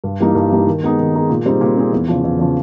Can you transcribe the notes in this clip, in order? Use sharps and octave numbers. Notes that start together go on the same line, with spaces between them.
G2
E3 G3 A#3 D#4
G2
E3 G3 A#3 D#4
D#3
G#3 B3 D#4 G#4
D#3
G#3 B3 D#4 G#4
A#2
G3 C4 D#4 G#4
A#2
G3 C4 D#4 G#4
E2
C#3 F3
E2
C#3 F3